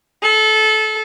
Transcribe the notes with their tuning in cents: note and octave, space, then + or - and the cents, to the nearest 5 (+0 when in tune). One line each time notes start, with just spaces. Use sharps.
A4 -25